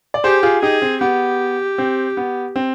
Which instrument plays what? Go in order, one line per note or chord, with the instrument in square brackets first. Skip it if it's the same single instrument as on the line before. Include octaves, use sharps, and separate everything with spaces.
[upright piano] D5
[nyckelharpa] G4 [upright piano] G#4 C5
[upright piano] F4 G#4
[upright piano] D#4 G4 [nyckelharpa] G#4
[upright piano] C4
[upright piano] B3 [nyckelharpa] G4
[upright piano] C4
B3
C4